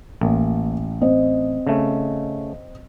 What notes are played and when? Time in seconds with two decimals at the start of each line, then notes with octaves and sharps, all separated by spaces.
0.21 A1 A#3
1.01 C4 D#5
1.67 C#3 A3